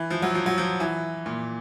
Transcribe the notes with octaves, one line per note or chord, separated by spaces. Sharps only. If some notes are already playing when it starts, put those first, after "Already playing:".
Already playing: E3
F3
F#3
F3
F#3
F3
E3
A#2